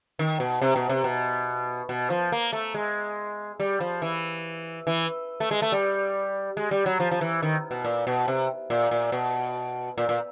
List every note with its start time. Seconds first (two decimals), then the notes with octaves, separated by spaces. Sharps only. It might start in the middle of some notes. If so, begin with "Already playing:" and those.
0.19 D#3
0.40 B2
0.61 C3
0.76 B2
0.89 C3
1.04 B2
1.89 B2
2.10 F3
2.32 A#3
2.53 A3
2.74 G#3
3.60 G3
3.80 F3
4.02 E3
4.87 E3
5.40 A3
5.51 G#3
5.62 A3
5.72 G3
6.57 G#3
6.71 G3
6.86 F#3
7.00 F3
7.11 F3
7.21 E3
7.42 D#3
7.71 B2
7.84 A#2
8.07 B2
8.28 C3
8.70 A#2
8.91 A#2
9.12 B2
9.98 A#2
10.09 A#2